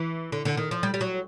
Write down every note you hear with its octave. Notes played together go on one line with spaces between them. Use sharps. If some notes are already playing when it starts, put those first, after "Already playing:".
Already playing: E3
D3
D3
D#3
F3
G3
G3
F#3